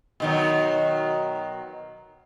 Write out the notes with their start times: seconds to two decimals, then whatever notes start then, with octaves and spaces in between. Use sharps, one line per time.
0.20 B2 D#3 F#3